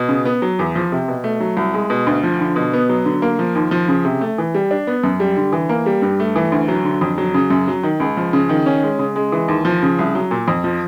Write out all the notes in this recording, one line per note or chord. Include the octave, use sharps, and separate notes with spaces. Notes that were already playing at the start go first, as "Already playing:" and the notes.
Already playing: B2
C#3
B3
F#3
E2
F3
C3
B2
A3
F#3
C2
G#3
B2
D2
F3
D3
B2
B3
F#3
D3
A#3
F3
D#2
F3
C#3
C3
A3
E3
G3
D4
B3
F#2
G3
D3
E3
A#3
G3
G2
A3
E3
D2
F#3
D3
F2
F#3
C#3
F#2
F#3
D#3
C#2
F3
C#3
D#3
C#4
G#3
C#3
G#3
E3
D#2
F3
C#3
C2
F#3
A#2
F2
F3